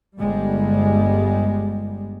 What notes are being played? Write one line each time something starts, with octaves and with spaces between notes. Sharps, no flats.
G1 G3 G#3